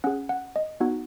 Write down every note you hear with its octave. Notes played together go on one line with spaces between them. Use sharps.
C#4 G#4 F#5
F#5
D#5
B3 D#4 F#4 F#5